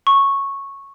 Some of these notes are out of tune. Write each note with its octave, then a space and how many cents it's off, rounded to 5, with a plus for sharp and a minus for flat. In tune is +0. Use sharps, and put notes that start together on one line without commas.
C#6 -10